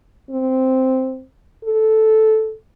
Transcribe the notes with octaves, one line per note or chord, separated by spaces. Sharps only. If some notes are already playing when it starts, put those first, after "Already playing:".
C4
A4